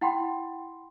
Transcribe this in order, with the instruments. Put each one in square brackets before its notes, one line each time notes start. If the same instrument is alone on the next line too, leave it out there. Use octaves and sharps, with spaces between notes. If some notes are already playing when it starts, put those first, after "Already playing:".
[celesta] E4 F#5 G5 B5 C6